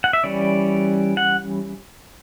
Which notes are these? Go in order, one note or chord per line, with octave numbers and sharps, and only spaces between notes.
F#5
E5
E3 G3 C#4 D5
F#5